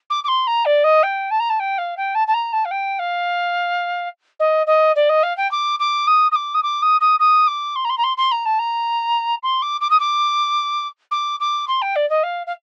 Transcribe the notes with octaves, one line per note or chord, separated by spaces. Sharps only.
D6
D6
C6
A#5
D5
D#5
G5
A5
A#5
A5
G5
F5
G5
A5
A5
A#5
A5
F5
G5
F5
D#5
D#5
D5
D#5
F5
G5
D6
D6
D#6
D#6
D6
D#6
D6
D#6
D#6
D#6
D6
C6
A#5
C6
A#5
C6
C6
A#5
A5
A#5
C6
D6
D6
D#6
D6
D6
D6
C6
G5
D5
D#5
F5
F5